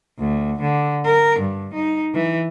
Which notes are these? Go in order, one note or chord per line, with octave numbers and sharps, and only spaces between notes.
D2
D3
A#4
G2
D#4
E3